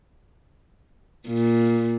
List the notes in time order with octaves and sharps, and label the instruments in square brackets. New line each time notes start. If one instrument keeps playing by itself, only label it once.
[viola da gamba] A#2